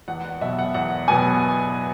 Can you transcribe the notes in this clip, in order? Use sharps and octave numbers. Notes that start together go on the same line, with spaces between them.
E2 F#5
F#5
B2 F#3 B3 E5
F#5
E2 F#5
B2 F#3 B3 G#5